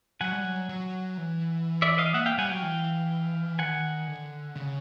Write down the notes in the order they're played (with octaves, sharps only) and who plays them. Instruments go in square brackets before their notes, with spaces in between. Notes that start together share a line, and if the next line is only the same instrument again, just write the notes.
[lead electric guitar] F#3 [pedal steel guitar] F#5 G#5
[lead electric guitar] G3
F#3
F#3
E3
[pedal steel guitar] D5 E5
D#5 F5
[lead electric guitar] A#3 [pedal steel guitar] E5 F#5
[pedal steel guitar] F5 G5
[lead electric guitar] G3 [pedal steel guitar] F#5 G#5
[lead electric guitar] F#3 [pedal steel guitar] F5 G5
[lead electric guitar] E3
[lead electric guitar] D#3 [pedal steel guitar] F#5 G#5
[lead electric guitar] D3
C#3